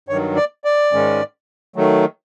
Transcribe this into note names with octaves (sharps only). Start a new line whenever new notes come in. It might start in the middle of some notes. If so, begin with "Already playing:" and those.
G2 D#3 F#3 C#5
D5
D5
G#2 D#3 G#3 C#4
D#3 F#3 A3